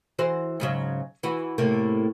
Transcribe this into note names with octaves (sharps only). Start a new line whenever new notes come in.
E3 F#4 C5
G#2 C#3 F#3
E3 F#4
A2 C3 A#3